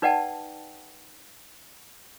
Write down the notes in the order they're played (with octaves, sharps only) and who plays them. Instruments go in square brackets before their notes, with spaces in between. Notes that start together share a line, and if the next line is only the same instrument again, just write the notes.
[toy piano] D#4 B4 D5 F#5 G5 A5